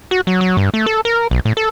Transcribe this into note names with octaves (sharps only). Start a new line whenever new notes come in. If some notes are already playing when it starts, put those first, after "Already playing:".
F#4
F#3
F#3
G2
A3
A4
A#4
B1
A2
A4